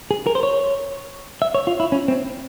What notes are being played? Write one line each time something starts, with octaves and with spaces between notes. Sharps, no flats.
G#4
A#4
C5
C#5
E5
C#5
F4
E4
C#4
C4